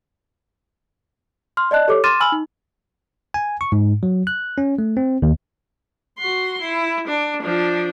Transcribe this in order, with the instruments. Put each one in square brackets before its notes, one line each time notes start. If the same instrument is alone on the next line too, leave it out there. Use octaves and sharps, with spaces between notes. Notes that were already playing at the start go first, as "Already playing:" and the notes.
[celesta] C6 F6
D5 D#5 A5 F#6
G4 A4 C#5 D6
C6 D6 F6 A6 D#7 E7
G#5 B5 E6 F6 F#7
D#4
[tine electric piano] G#5
C#6
G#2
F#3
F#6
C#4
A3
C4
D#2
[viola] F#4 C6
E4
D4
F3 D4